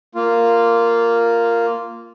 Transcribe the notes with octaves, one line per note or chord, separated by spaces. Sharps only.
A#3 F4